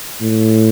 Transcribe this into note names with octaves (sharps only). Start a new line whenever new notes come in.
A2